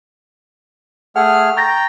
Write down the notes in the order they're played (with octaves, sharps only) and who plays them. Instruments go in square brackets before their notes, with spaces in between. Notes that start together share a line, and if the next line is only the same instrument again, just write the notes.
[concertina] A3 G#4 F6 [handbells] F#5
[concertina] G5 A#5 [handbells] C#6 A6 A#6